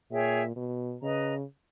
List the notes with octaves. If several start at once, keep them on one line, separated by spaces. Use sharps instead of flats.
A#2 G#4 C#5 E5 G5
B2
C#3 B4 D#5 A#5